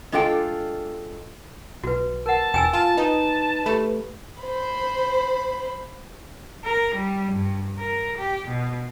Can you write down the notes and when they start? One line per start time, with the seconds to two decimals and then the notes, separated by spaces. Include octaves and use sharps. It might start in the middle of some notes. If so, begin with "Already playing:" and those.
0.12 G#3 D4 F4 A4 G5
1.84 B1 F#4 B4
2.26 A#4 F#5 A5
2.54 E1 G5 G#5 E6
2.73 F4 A5 A6
2.97 D#4 B4 A5
3.66 A3 G4 B5
4.42 C5 B5
6.65 A#4
6.95 G3
7.32 G2
7.78 A#4
8.18 G4
8.48 B2